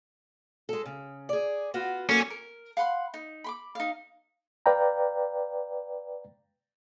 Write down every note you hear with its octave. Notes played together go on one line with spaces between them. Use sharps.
G#3 A4
C#3
G#4 D5
B3 F4 F#4
F#3 A#3 C#4 A4
A#4
F5 F#5 B5 C6
D#4
B5 C6 D6
D#4 F5
B4 D5 F5 G5 A#5